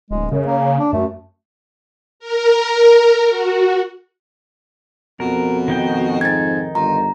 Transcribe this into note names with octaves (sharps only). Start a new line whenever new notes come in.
D1 G#3
F#2 C#3
A#3
D4
F#2 A3
A#4
F#4
F2 B2 A#4
D#3 D#4 G5
G#2 G#6 A6
G1 F4 A#5